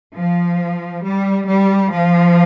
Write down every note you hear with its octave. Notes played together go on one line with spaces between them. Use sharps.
F3
G3
G3
F3